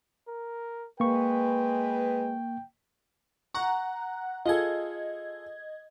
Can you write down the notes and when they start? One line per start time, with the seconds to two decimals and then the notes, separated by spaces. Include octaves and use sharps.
0.28 A#4
1.00 G#3 A#3 B4 G5 C#6
3.54 F#5 A#5 C#6 F#6
4.46 F4 G#4 A4 D#5 G#6